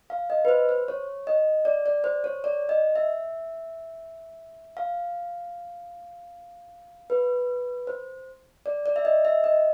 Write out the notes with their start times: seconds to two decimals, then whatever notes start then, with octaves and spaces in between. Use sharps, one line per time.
0.10 F5
0.30 D#5
0.45 B4
0.48 C5
0.69 C5
0.88 C#5
1.27 D#5
1.65 D5
1.86 D5
2.04 C5
2.24 C#5
2.44 D5
2.69 D#5
2.96 E5
4.77 F5
7.10 B4
7.87 C5
8.66 D5
8.86 D5
8.96 E5
9.05 D#5
9.25 E5
9.44 D#5